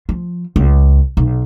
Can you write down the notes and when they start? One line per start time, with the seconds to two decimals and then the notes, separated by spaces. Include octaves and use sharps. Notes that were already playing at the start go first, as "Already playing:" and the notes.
0.09 F3
0.56 C#2
1.17 B1